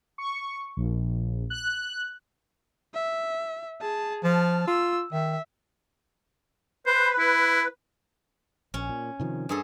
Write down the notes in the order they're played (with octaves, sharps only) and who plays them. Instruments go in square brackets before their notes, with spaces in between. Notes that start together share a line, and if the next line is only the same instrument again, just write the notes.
[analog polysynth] C#6
A#1
F#6
[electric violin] E5
G#4 A5
[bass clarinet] F3 [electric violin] A5 F6
[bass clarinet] F4 [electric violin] E6
[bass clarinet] D#3 [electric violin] E5
[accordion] B4 [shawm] C5
[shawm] E4
[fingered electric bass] A#1 [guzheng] C#4
[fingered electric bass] A#2
C3 D#3 F3
[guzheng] G2 G#4 A4